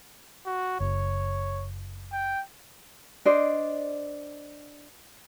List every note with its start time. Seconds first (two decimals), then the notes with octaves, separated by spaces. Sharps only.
0.46 F#4
0.80 F#1 C#5
2.12 G5
3.25 D4 C5 D5 D#5